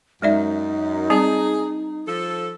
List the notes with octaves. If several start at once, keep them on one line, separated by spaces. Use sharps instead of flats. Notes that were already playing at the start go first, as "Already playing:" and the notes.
F#2 G#3 D#4 D5 E5
G3 C4 G#4 A5
F3 A4